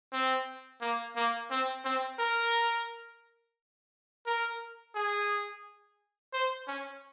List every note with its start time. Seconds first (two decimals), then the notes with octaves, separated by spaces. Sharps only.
0.13 C4
0.81 A#3
1.16 A#3
1.51 C4
1.85 C4
2.19 A#4
4.26 A#4
4.95 G#4
6.33 C5
6.67 C#4